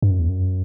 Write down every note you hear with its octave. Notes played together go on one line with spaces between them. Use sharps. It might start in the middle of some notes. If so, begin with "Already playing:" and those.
G2
F#2
E2
F#2